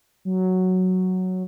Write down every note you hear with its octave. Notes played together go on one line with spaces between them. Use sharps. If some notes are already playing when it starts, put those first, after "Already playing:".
F#3